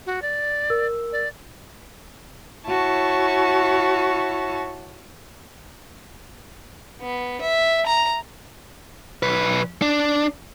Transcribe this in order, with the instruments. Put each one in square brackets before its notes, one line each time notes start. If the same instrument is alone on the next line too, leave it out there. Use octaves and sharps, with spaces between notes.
[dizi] F#4
D5
[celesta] A#4 E6
[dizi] D5
[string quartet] E4 F#4 C#5 A5 C#6
[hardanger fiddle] B3
E5
A#5
[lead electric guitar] B1 B4
D4